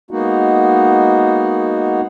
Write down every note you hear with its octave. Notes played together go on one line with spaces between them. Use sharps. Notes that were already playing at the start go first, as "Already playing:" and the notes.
G#3 A#3 B3 D#4 F#4